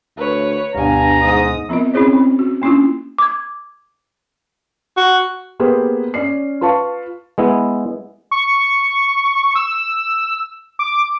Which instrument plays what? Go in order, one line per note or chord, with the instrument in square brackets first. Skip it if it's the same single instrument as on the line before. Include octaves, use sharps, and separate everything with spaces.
[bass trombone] D2 [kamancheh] B4 C#5
[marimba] D2 B2 B3 [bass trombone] G2 [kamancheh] F5 G#5 [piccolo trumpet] A#5
[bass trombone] G#2 [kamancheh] D#6
[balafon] F3 B3 C4 F4 A#4 D#5
C4 C#4 E4 G#4 C5 C#5
C4
F#4
A#3 C#4 D4 E4 F4
[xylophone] D6 G#6
[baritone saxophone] F#4
[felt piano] A#3 B3 G4 G#4 B4 C5
C#4 D5 C7
F4 B4 F5 A5 C#6
[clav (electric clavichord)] G#3 B3 E4
[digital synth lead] C#6
E6
D6